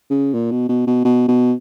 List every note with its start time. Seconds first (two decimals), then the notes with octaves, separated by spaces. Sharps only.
0.10 C#3
0.34 A#2
0.52 B2
0.69 B2
0.87 B2
1.05 B2
1.29 B2